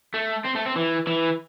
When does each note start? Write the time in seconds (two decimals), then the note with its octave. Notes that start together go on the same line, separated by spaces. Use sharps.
0.14 A3
0.45 C4
0.56 A3
0.66 C4
0.76 E3
1.07 E3